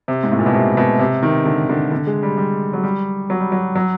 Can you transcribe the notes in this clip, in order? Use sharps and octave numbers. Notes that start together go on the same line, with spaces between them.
C3
G#2
A2
A#2
B2
C3
B2
C3
D#3
D3
D3
D3
G#3
G3
G3
F#3
G3
F#3
G3
F#3
F#3